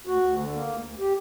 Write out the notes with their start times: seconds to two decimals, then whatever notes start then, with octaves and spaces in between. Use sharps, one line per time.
0.07 D2 F#4
0.22 D2
0.38 D3
0.53 A#3
0.69 D2
0.84 D2
0.99 G4